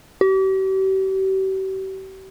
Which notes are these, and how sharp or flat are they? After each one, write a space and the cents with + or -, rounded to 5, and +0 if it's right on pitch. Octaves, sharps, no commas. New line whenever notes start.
G4 -40